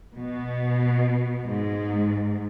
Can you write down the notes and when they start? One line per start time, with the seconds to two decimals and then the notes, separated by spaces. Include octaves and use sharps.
0.18 B2
1.45 G#2